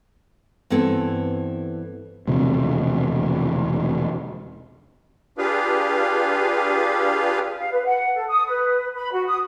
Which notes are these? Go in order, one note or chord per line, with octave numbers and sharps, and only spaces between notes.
G2 E3 B3 C4 A4
E1 D2 C3 F3
D4 F4 G4 G#4 B4 F5
F5
B4
F#5
A4
D#6
B4
B5
F#4
D#6